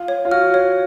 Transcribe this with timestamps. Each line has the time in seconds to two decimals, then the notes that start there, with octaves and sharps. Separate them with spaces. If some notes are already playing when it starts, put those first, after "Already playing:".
Already playing: F4
0.08 C#5
0.25 F4
0.31 F#4 F6
0.54 C#5